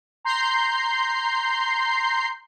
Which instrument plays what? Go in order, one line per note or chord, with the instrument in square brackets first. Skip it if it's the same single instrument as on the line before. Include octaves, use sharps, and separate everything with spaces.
[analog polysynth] A#5 C6 G6 C7